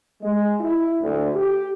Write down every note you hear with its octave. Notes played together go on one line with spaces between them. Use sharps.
G#3
E4
D2
G4